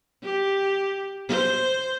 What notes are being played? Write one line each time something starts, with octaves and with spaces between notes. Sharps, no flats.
G4
C5